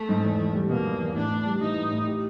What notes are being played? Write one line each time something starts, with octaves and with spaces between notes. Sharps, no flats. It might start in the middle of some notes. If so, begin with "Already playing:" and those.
Already playing: A3
G#2
E2
E2
G3
B2 A#3
E2
E2
A2 D4
A2
G3
E3 D#4
A2
A2
G4